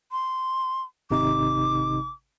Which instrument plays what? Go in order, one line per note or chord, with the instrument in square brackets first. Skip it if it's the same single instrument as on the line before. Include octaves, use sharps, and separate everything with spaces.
[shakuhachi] C6
[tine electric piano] G#1 C3 D#4 [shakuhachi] D6